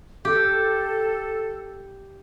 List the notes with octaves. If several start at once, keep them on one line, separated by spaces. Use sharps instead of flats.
G4 A4